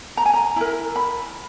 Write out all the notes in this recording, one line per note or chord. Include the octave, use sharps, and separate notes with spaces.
A#5
G#5
A#5
E4 A#4
B5